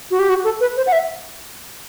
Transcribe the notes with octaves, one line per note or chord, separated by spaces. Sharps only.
F#4
G4
F#4
A4
B4
C5
F#5
E5